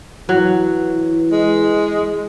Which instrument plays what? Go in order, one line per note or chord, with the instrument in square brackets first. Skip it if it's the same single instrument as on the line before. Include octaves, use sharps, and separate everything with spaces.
[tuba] E3 [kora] F#3
[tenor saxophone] G#3